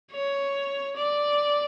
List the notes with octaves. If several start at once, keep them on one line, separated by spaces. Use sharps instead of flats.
C#5
D5